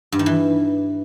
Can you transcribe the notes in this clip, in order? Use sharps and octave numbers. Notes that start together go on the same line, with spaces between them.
G2
D#3
E3